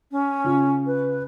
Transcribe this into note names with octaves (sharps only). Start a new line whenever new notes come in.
C#4
C#3 F4
B4